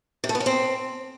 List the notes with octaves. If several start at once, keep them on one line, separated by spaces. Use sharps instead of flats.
C3
A3
B3
C#4
C4